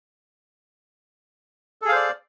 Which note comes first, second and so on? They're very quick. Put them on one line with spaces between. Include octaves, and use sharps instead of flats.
A4 G#4 F5 C5 D5